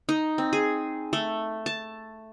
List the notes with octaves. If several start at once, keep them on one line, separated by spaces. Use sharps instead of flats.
D#4
C4
G#4
A3
A5